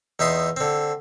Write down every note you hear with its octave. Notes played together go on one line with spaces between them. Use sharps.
E2 D#4 E5 C6
D3 C4